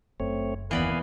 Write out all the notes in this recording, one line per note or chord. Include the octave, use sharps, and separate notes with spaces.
F#1 F#2 A3 C4 C#5
D#2 E3 B3 D5 F5 G#5 B5